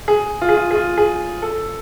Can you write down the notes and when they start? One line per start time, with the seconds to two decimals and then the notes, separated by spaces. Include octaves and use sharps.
0.08 G#4
0.41 F4
0.49 G#4
0.56 F4
0.71 G#4
0.75 F4
0.97 G#4
1.42 A4